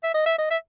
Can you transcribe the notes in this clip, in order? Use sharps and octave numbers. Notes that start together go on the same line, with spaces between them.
E5
D#5
E5
D#5
E5